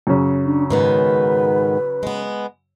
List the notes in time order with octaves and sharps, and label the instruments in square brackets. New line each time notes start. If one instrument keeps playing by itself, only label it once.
[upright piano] F#2 C#3 C#4
[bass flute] D4
[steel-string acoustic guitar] G#2 D#3 B3 [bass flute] B4
[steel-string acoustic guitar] G#3 B3